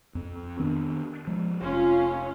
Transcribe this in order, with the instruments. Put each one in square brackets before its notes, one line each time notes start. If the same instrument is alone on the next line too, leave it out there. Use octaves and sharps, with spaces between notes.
[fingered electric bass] F2 C4
D#3 B3 D4
F3 G#3
[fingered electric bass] F1 [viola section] C#4 F4